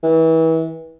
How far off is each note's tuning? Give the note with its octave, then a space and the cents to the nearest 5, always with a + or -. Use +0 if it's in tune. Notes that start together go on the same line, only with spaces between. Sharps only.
E3 -30